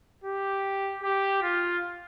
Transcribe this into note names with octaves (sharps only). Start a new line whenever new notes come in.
G4
G4
F4